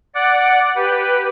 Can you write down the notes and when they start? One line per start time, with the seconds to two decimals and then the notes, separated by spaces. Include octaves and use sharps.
0.15 D5 F#5
0.76 G4 B4